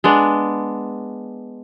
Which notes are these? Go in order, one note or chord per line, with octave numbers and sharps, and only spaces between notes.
G#3 B3 D4